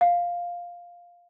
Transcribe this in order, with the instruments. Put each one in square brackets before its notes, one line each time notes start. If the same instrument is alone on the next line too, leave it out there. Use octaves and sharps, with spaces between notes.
[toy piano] F5